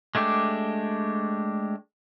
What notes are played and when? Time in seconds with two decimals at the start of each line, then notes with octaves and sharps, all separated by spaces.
0.15 G#3 A3 D4 G4